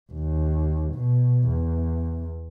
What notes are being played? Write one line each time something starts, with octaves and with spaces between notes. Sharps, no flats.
D#2
B2
E2